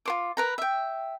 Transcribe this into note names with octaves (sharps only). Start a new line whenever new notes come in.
F4 C5 D6
A#4 B4 A#5
E5 G5